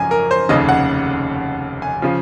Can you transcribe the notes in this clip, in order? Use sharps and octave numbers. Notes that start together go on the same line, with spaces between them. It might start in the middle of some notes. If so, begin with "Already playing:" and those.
Already playing: G#1 F#2 C#3 F3 G#5
A#4
C5
F1 D#2 C#3 D#5
F#5
G#5
C#3 F3